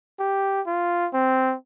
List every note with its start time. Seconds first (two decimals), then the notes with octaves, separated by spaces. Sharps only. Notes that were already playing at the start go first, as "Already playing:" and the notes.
0.19 G4
0.66 F4
1.13 C4